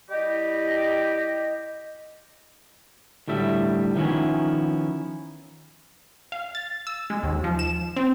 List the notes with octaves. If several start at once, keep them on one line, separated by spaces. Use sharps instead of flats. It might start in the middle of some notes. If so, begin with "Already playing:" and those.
G3 E4 G4 D#5
D2 A2 G3 E5
D#3 F3 B3 C#4 E4
F5
A6
E6
G#3
D#2
F3
E7
C4